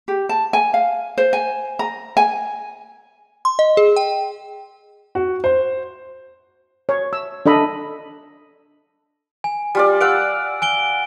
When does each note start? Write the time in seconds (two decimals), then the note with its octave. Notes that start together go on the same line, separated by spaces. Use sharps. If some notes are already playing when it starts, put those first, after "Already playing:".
0.08 G4
0.29 A5
0.53 G#5
0.74 F5
1.18 C5
1.33 G#5
1.79 A#5
2.17 G#5
3.45 C6
3.59 D#5
3.77 G#4
3.96 G5
5.15 F#4
5.44 C5
6.89 C#5
7.13 E6
7.46 D4 A4 D#5 B5
9.44 G#5
9.75 G3 F4 D5
10.01 F5 F#5 E6 D7
10.62 G#5 D7 G7